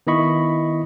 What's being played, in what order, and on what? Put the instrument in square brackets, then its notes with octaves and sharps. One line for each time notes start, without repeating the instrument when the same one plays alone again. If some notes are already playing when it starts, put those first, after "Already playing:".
[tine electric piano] D#3 B3 E4 D#5 B5 C#6